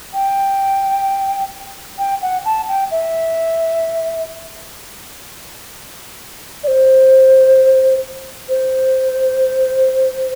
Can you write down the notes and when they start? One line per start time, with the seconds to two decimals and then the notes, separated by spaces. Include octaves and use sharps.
0.14 G5
1.98 G5
2.22 F#5
2.45 A5
2.68 G5
2.91 E5
6.64 D5
6.68 C5
8.49 C5